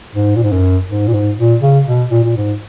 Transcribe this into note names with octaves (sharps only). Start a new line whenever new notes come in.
G#2
A#2
G#2
F#2
G#2
A#2
G#2
A#2
C#3
B2
A#2
A#2
G#2